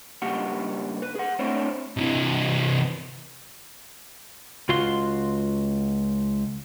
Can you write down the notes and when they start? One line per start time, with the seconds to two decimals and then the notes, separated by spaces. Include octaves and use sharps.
0.22 G2 C#3 A#3 G4 F#5
1.02 B4
1.15 G#4 F#5
1.39 A3 C4 D4 E4 C5 C#5
1.97 C3 E3
4.69 C#2 F4 F#4 F5 C6